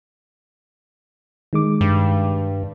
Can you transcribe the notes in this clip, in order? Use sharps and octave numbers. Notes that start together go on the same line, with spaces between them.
D#3 G#3 D6
G2